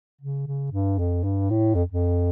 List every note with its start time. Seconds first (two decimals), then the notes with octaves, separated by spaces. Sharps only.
0.21 C#3
0.47 C#3
0.72 G2
0.98 F2
1.23 G2
1.50 A2
1.75 F2
1.92 F2